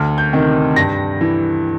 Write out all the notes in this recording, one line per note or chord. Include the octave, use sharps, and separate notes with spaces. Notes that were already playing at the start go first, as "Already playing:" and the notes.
Already playing: D2 F6
G6
C3 D#3
G2 A#6
E3